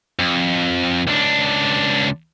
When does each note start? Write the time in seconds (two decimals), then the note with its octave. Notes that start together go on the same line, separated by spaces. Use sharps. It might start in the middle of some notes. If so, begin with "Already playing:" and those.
0.19 F2
1.07 C#2 D4